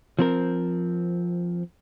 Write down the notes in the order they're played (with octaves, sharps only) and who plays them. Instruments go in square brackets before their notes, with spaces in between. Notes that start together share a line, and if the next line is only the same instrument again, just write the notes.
[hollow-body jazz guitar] F3 C4 A#4